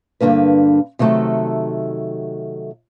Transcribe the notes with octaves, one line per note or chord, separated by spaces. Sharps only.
G2 B2 D3 A#3 B4
C3 D#3 F#3 A3 A4